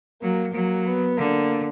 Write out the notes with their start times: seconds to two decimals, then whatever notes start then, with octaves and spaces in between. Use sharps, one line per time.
0.22 F#3 A#3
0.54 F#3 A#3
0.87 B3
1.18 D3 A#3